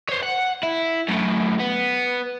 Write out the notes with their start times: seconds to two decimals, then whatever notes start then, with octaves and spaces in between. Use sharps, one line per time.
0.09 C5 C#5
0.23 F#5
0.63 E4
1.08 F#2 A2
1.59 B3